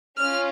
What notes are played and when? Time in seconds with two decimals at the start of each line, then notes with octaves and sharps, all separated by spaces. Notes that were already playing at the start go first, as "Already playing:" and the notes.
0.19 C#4 F4 F6